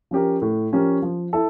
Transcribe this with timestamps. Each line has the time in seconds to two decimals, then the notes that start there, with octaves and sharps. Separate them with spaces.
0.11 F3 C#4 G4 A#4
0.42 A2
0.72 F3 C#4 G4 A#4
1.02 F3
1.33 E4 A4